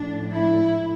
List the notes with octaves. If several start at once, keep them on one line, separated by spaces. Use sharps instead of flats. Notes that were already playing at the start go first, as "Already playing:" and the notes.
Already playing: A2 F3 D4
E4